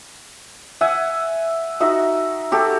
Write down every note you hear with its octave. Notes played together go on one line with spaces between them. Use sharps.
E5 F#5 G#5
D#4 F#4 E5
F#4 G4 A4